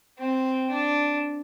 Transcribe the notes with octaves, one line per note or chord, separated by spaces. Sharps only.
C4
D4